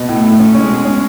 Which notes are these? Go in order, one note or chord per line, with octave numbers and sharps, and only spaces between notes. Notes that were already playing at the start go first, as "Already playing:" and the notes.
Already playing: B2
A2 A3
A2
C#4
G#3 C#4
B2
C#4